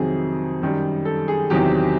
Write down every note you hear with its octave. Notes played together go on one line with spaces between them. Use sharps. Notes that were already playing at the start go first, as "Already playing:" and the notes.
Already playing: F2 C3 D#3 F#3 G#4
F#2 D#3 G3
A4
G#4
E2 C3 D#3 F#3 G4